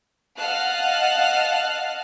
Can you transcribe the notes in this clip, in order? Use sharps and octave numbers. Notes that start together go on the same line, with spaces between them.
D#5 F5 F#5 A5 F6 F#6